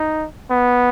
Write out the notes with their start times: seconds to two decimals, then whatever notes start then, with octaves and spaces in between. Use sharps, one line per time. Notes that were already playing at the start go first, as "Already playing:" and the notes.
Already playing: D#4
0.50 B3